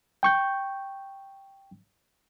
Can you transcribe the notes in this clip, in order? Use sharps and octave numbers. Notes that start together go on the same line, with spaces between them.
G5 C#6 G6